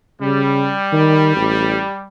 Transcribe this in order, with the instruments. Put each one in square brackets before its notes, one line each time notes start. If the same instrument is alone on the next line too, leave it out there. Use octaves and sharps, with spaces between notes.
[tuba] C#3 [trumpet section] G3
[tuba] D#3
A1